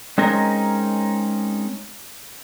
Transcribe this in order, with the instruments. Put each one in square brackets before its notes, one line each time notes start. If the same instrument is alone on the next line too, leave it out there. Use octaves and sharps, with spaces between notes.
[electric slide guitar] G#3 C4 C#4 D#4 A#4